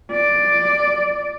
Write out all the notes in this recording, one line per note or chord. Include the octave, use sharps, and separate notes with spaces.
D5